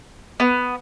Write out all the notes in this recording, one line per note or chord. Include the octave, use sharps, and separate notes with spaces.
B3